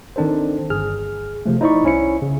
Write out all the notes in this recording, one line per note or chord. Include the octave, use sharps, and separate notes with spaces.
D#3 C4 D4 A4 C5
G1 G#4 F6
C3 F3 A3
D#4 E4 C5 D5 B5 C#6
C2 C#4 E4 C#7
C#3